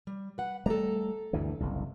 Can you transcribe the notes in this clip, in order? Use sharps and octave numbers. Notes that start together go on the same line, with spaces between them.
G3
B4 F#5
G3 A3 A4 A#5
D2 G2 E3
F#1 C2